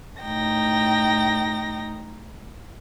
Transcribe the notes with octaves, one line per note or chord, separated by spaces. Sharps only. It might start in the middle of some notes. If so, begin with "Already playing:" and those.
A2 D#4 G5 A#6